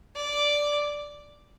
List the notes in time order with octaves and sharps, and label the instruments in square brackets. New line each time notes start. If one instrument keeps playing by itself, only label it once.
[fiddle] D5